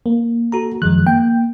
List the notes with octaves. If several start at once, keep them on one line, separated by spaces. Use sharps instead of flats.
A#3
F#4 A4 A#5
F#2 D#3 F3 G#3 F#6
A#3 G5